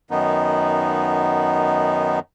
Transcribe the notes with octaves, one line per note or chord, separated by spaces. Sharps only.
F#2 D#3 B3 D#4